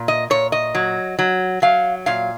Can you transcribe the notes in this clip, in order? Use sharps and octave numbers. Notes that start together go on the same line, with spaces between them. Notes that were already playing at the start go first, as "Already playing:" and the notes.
Already playing: A#2
D#5
A#2 C#5
D#5
F#3
F#3
F#3 F5
A#2 F5